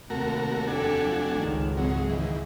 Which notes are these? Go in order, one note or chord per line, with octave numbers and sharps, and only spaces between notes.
D#2 C3 A3 F#4 A#4
F2 D4 F#4 G4 A4 G#5
F3 A3
G#1 C#2 D#3 G#3
F2 F#3 G#4
D#3 E3